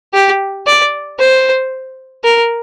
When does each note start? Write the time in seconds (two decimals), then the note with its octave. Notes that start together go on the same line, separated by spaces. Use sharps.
0.13 G4
0.67 D5
1.19 C5
2.24 A#4